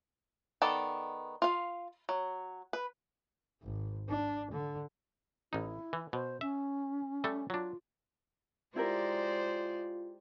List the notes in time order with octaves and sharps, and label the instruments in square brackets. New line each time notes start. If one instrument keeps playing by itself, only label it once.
[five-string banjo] D#3 B3 A4 D5
F4 F5
F#3
B4
[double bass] G#1
D4
D3
[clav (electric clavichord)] A1 D#4 [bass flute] E4
[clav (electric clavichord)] E3
[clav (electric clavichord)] B2 [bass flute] C5
[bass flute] C#4 [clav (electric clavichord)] E5
[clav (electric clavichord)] G3 A3 A4
[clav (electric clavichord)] F#3 D4 [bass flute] F4
[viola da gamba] G#3 C5 D5 [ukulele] E4 G4 A#4 [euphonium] F4